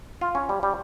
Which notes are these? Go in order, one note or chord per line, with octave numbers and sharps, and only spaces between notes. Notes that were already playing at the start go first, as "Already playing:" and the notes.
F4
C#4
G3
G3